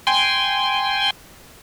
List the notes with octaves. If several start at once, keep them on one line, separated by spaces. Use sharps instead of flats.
G5 G#5 C6